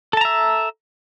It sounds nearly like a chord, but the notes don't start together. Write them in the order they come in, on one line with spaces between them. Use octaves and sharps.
A4 A5 A#5 E5